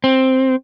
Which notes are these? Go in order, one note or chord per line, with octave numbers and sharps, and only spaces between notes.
C4